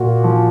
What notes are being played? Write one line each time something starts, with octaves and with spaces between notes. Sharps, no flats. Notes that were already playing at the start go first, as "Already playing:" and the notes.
Already playing: A#2 F#4
F3